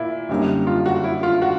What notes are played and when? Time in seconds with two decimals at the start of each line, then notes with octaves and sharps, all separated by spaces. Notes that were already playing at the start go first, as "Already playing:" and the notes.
Already playing: A#2 E4
0.29 F#2 D3 G3 A#3 D#4
0.67 F4
0.85 F#4
1.04 E4
1.23 F4
1.42 F#4